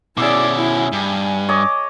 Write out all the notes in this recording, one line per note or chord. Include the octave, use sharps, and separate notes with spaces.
B2 C#4 E4 G#4 D5 E5 D6
E4
G2 G#5
C#5 D#5 D6